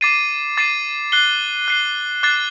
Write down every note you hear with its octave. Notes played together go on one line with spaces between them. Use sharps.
D6 A6 C7 D#7
D6 A6 C7 D#7
F#6 C7 G7
F#6 C7 G7
D6 F#6 A6 C7